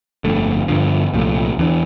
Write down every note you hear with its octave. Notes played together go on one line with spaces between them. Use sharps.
G1 F2 D3 A3
G2 D3 F3
C2 A#2 F3 A3
E2 E3 A#3 D4